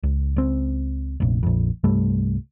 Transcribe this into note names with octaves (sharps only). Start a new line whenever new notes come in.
C#2
C#2 C4
F1 A#1
A#1 F2
C2 G2 G3 A3